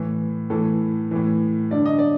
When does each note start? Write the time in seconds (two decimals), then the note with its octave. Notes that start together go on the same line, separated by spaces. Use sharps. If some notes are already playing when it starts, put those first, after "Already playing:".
Already playing: A2 E3
0.50 A2 E3 A4
1.11 A2 E3
1.71 G2 D3 D5
1.86 D#5
1.99 D5